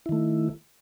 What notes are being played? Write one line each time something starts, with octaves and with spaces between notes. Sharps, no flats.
D#3 A3 E4